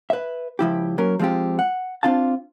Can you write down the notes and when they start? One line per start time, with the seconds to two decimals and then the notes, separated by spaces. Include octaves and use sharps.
0.10 B4 E5
0.59 C#2 F3 E4 G4
0.98 F#3 A#3 C#4 A#4
1.19 F3 G#3 C4 F4 G4
1.59 F#5
2.03 C4 D4 F4 F5 A5